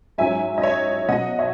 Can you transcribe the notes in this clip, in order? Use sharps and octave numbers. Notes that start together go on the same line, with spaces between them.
G#2 F#3 C#4 E5 G#5
D#5
C#5 E5
B2 F#3 C#4 D#5 F#5
C#5 E5